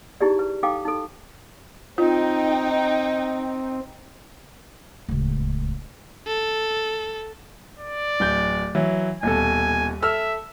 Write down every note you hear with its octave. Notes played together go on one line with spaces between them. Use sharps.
D#4 E4 G4 G#4 D5
B4
D#4 A4 F5 G5 D6
D#4 A4
C4 D#4 F4 G5
D1 C#2
A4
D5
D1 G6
E3 F#3
D#1 B2 A4 G#5
A4 E5 E6 F6